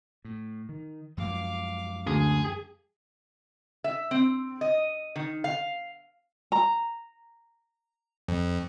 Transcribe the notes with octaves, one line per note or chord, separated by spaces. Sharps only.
A2
D#3
F#2 F3 G#3 F5 D6
D2 G#4
E5
C4
D#5
D#3
F5
A#5
F2